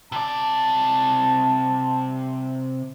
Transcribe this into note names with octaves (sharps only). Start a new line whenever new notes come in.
C3 D5 A5